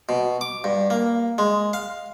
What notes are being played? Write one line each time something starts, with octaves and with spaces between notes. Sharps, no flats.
B2
D6
G2
A#3
G#3
F5